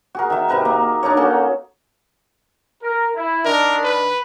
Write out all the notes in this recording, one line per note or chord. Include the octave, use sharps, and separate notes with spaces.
F#4 G#4 A#4
D#3 E5
C3 A#4 B4 A#5
A#3
D4 D#4 A#4 C#5
A#3 C#4 F#4 A4
A#4
E4
D#3 D4 A#4
B4